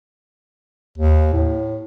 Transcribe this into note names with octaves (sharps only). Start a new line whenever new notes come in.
D#2
A2